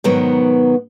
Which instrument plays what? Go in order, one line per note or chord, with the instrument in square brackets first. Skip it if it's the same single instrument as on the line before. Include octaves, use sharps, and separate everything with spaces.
[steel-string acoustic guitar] G#2 B2 D#3 F#3 B3